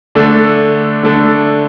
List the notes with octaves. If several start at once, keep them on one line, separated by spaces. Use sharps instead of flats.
D3 A3 D4 A4
D3 A3 D4 A4